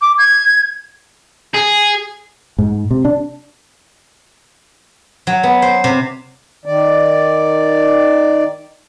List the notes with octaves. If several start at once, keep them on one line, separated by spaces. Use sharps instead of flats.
D6
G#6
G#4
G#2
C3
D4
F#3
B3
C5
C3
D#3 D5